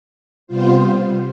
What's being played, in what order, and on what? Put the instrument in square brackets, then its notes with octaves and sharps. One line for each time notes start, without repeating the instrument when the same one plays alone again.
[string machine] C3 G3 B3 F4 C5